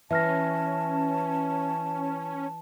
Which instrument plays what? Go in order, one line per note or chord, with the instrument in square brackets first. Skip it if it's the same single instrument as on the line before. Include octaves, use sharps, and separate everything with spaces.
[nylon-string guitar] E3 [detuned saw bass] C#4 [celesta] E5 F6 A#6 [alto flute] A5